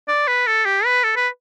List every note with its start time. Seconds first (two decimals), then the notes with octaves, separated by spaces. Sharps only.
0.08 D5
0.28 B4
0.47 A4
0.66 G4
0.85 B4
1.04 A4
1.16 B4